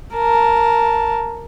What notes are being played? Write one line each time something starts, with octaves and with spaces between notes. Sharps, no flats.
A#4 A5